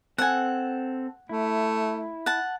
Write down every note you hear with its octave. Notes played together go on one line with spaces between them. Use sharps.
C4 A4 F#5 G#5
A3 E4
F#5 A5